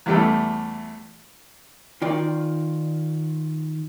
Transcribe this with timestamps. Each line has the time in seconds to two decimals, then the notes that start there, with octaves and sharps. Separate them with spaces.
0.06 E2 G3 A3
2.02 D#3 F4 D5